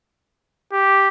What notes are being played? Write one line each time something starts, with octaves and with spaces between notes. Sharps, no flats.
G4